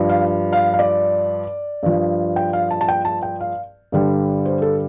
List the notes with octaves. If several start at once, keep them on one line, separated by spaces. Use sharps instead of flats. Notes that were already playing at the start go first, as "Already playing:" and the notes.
Already playing: G2 F3
F5
F5
F5
D5
G2 F3
G5
F5
A5
A5
G5
A5
G5
F5
G2 D3 G3
C5
A4